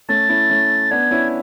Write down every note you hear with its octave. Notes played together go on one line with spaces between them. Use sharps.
A3 C#4 A6
C#4 E4
A3 C#4
B3 D4 G#6
C#4 E4